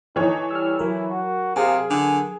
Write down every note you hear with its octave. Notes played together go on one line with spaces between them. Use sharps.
E3 D#4 A4 C#5
G3 E6 F6
F#3 E4 A#4
F#4
C3 G#4 F5
D3 G#5